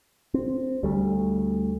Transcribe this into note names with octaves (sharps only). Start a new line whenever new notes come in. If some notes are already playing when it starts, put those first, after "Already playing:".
C4
D2 G3 A3